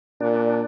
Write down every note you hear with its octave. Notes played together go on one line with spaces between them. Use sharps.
A#2 D4